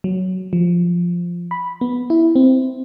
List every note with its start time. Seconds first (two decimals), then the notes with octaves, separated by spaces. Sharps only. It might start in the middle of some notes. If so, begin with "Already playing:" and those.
0.04 F#3
0.53 F3
1.51 B5
1.81 B3
2.10 E4
2.36 C4